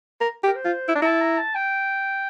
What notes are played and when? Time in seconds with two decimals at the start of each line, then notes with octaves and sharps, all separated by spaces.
0.21 A#4
0.44 G4
0.47 A#4
0.55 C5
0.65 F4
0.89 E4
0.96 D4
1.01 E4 A5 A#5
1.21 A#5
1.38 A5
1.55 G5